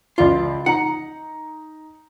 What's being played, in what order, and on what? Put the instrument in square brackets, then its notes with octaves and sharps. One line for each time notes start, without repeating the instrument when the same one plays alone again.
[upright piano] C#2 D5 E5 [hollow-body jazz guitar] F4
[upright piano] D#4 A#5 [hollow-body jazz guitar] F#5